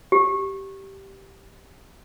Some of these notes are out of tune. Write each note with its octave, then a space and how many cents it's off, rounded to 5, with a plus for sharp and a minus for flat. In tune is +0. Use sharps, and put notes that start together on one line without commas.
G4 -10